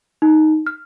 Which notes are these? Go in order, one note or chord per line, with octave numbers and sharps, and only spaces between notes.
D#4
F6